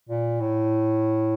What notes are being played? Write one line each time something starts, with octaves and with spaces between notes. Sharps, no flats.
A#2
A2